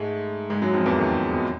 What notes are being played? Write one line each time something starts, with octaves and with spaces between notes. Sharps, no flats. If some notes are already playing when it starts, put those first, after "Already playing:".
Already playing: G#2 G#3 A3
G#2 G#3
F#2 F#3
F2 F3
E2 E3
D#2 D#3
B2